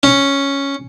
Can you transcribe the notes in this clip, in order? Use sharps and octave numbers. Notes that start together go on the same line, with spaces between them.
C#4